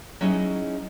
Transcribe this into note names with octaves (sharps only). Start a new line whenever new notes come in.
F#3 C#4 D#4 E4 G#4 D#5